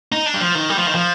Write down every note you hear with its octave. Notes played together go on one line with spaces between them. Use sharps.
D#4
D4
G3
F3
D#3
G3
F3
D#3
F3